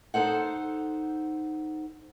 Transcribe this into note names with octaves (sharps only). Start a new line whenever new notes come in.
D#4 A4 C5 F#5